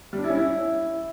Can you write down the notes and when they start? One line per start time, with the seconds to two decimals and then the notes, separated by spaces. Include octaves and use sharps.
0.13 G3
0.18 D4
0.24 E4
0.29 C#4
0.35 E4